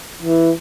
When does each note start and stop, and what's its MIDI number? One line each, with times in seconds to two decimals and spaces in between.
0.23 0.51 52